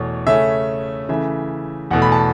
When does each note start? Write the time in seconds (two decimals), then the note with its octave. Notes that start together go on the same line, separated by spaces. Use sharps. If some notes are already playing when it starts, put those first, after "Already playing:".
Already playing: E2 B2 A3 C#5
0.27 C#3 A3 C#4 E5
1.09 C#3 E3 A3 E5
1.91 E2 B2 A3 F#5
2.02 B5
2.12 A5